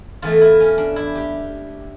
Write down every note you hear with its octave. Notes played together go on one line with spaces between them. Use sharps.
E2 E3 A3 F4
E4
C#4
D4
E4
G4